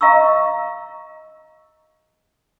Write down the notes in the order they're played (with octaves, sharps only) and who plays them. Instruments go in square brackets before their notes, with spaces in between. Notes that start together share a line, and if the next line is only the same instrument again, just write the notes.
[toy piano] D#5 F5 A#5 C#6 E6